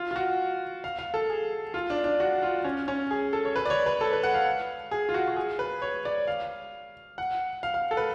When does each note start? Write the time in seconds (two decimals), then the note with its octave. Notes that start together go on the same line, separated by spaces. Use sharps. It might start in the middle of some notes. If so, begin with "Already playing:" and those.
Already playing: F4
0.11 F4
0.16 F#4
0.84 F5
0.99 F5
1.14 A4
1.30 G#4
1.74 F4
1.90 D4
2.04 D4
2.20 F#4
2.43 F4
2.64 C#4
2.88 C#4
3.11 G#4
3.33 A4
3.45 C#5
3.56 B4
3.66 D5
3.70 C#5
3.86 B4
4.01 A4
4.13 B4
4.23 F#5
4.34 F5
4.91 G#4
5.09 F4
5.14 F#4
5.28 F#4
5.37 G#4
5.59 B4
5.82 C#5
6.05 D5
6.27 F5
7.18 F#5
7.63 F5
7.74 F5
7.91 A4
7.97 B4